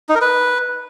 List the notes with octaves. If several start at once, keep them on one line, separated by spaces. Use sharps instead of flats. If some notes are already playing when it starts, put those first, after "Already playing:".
D#4
A#4
B4